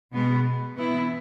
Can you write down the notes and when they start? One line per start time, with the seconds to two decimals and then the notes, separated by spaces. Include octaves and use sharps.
0.13 B2 G#3 B3
0.75 E3 B3 E4